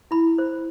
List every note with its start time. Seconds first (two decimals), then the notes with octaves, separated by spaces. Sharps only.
0.11 E4 B5
0.38 C5